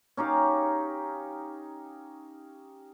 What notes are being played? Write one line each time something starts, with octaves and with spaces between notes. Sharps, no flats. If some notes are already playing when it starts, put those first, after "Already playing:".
C#4 D#4 G4 F5